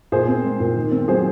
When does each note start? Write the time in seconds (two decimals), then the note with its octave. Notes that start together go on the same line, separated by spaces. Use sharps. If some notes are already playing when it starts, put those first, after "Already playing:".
0.12 A#2 G#4 C5
0.28 C4
0.44 G#3
0.60 A#2
0.76 D#3
0.91 C4
1.08 F#3 G#4 C5